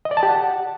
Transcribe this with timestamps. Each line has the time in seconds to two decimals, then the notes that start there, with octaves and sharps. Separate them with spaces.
0.05 D#5
0.11 D5
0.17 A5
0.23 G4
0.29 F#5